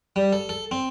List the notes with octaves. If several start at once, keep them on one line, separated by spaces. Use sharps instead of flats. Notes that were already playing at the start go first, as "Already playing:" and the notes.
G3
A4
A4
C4